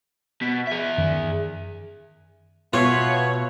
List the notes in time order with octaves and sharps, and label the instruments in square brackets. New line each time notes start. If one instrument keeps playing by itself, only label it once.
[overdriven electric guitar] B2 [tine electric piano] B6
[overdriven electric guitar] G#4 E5
[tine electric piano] F#2 D#3
[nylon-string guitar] B2 F5 [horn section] B3 B4 E5 [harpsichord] F4 [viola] C#5